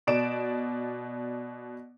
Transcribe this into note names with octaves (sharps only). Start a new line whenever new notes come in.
B2 D5 D7 E7